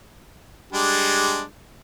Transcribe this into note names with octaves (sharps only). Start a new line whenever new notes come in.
G3 G#3 D4